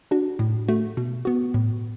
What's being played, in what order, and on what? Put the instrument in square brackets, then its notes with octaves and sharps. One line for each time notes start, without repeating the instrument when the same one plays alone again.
[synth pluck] D4 F#4
A2
A3 F#4
B2
B3 F#4
A2